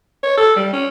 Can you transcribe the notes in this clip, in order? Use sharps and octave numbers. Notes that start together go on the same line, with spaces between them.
C#5
A4
G3
C#4